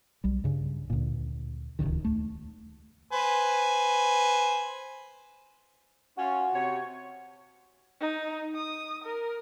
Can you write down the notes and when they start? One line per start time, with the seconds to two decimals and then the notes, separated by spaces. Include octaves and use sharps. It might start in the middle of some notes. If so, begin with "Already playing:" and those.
0.24 B1 G3
0.44 G2 C#3
0.90 D2 A#2
1.79 D1 G#1 C#2 D#3
2.05 D#2 A3
3.12 B4 C5 G#5
6.17 C#4 F4 F#4
6.54 C3 C#5
8.00 D#4
8.56 D#6
9.04 A#4